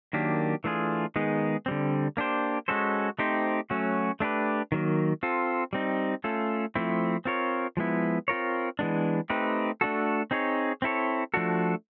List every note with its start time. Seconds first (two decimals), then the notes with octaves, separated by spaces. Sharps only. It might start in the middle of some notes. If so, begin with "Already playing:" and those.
0.13 D#3 F#3 A#3 D4 G4
0.64 E3 A3 D4 F4 G#4
1.16 D#3 G#3 B3 D#4 G#4
1.66 D3 G3 C4
2.17 A#3 D4 G4 C5
2.68 G#3 C#4 F#4 A4 C5
3.19 A3 C4 D#4 G4 C5
3.70 F#3 A3 C#4 F#4
4.20 A3 D4 G4 B4
4.72 D#3 F#3 A#3
5.23 C4 F4 A4
5.73 G3 C4 D#4
6.24 A3 C#4 F4 A4
6.75 F3 A3 C4 E4
7.25 C4 F4 A#4 C#5
7.77 F3 G#3 B3 E4
8.28 C4 F4 A#4 C#5
8.79 E3 G#3 B3 D4
9.30 A3 C4 D#4 G4 B4
9.81 A3 D4 F#4 A4
10.31 C4 D#4 G#4 C#5
10.82 C4 E4 A4 C#5
11.34 F3 A3 D4 F#4 A4